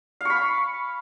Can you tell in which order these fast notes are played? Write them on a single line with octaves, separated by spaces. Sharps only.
F5 C#6 B5